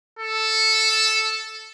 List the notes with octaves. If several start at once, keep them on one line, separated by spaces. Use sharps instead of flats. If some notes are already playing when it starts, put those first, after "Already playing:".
A4